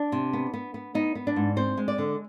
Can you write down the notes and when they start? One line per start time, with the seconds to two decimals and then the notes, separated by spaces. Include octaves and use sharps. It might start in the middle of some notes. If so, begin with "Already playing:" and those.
Already playing: D4
0.12 C3
0.33 B3
0.54 B3
0.74 B3
0.95 B3 D#4
1.15 B3
1.27 D4
1.36 G#2
1.57 C4 C5
1.77 G#3
1.88 D5
1.98 D3